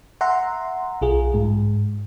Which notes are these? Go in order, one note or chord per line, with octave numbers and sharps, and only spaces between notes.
E5 F#5 A#5 C6
B1 F4 G#4
G#2